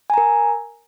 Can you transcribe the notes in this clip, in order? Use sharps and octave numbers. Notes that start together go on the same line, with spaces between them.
A#4 G#5 A#5